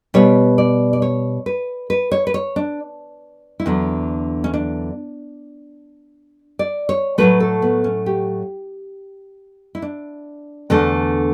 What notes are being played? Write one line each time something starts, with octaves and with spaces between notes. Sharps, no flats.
B2 G3 B3 C#5
D5
D5
C#5
B4
B4
C#5
B4
C#5
D4
E4
E2 D3 F#3 D4
C#4
D4
D5
C#5
A2 F#3 A3 B4
A4
B3
C#4
G4
E4
D4
E2 D3 A3 D4